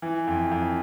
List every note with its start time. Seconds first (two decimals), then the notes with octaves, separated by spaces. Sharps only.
0.02 E3
0.27 F2
0.51 F2